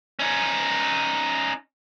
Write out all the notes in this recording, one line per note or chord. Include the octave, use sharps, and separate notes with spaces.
C#4 D#4